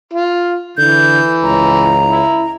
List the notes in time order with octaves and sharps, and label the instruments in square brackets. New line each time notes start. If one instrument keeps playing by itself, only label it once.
[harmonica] F4
[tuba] D3 [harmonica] E3 [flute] G6
[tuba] C#2 [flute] A#5
[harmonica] E4